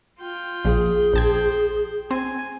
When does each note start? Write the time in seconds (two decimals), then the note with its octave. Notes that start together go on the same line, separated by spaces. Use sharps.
0.20 F4 G5
0.65 A#1 F3 G#4
1.13 A#1 C5 G5 A5 G#6
2.11 C4 G#5